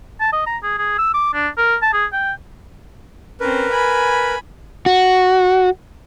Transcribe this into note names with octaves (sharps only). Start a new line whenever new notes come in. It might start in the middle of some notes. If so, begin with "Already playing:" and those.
A5
D#5
A#5
G#4
G#4
E6
D6
D4
A#4
A5
G#4
G5
C4 C#4 A#4 B4
G#5 B5
F#4